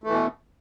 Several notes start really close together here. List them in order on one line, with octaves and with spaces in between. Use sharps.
A3 E3 B2